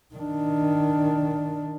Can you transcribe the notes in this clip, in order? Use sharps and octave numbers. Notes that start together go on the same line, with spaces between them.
D#3 D4